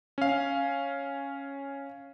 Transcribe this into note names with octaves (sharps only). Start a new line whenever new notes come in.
C#4 F5